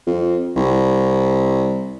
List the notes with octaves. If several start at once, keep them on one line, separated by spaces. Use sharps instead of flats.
F2
C2